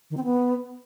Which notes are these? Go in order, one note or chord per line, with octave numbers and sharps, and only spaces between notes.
D#3
C4
B3